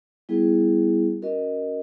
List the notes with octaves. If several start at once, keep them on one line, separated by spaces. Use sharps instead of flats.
G3 B3 E4 G#4
C#4 F#4 A#4 D#5